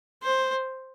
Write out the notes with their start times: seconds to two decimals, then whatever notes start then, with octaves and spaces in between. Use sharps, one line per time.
0.23 C5